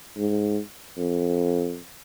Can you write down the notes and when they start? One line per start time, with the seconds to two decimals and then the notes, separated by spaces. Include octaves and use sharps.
0.17 G#2
0.97 F2